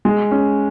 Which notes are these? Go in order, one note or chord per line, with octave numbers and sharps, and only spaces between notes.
G#3
C#4